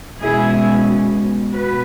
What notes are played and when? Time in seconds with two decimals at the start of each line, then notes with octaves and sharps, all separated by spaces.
0.20 B2 G#3 C#4 E4 G#4
1.52 B2 B3 F#4 B4